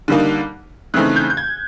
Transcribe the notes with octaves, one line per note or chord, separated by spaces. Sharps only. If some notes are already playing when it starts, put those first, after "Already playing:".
D3 G3 A#3 D#4
C#3 E3 A3 C4 D#4 F#6
G6
G6
G#6